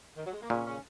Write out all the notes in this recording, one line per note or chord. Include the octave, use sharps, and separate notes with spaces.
D#3
F#3
G#3
A#3
A#2 C#3 C#4
C#3 C#4